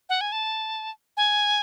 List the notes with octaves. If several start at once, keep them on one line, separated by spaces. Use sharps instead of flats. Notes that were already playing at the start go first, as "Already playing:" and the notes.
F#5
G#5
A5
G#5